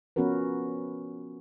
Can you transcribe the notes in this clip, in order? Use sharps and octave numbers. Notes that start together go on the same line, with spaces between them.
F3 B3 C#4 F#4 A#4 B4